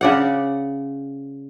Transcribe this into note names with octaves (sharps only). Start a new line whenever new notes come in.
C#3 D5 F#5